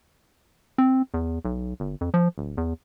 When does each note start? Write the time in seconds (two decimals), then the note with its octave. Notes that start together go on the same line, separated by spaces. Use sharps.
0.78 C4
1.14 E2
1.45 B1
1.80 G1
2.01 F2
2.14 F3
2.38 D1
2.57 E2